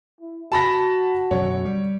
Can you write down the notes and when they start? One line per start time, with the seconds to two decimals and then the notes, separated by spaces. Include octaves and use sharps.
0.21 E4
0.52 F#4 A5 B5 A#6
1.31 F#2 B2 D3 C#5
1.65 G3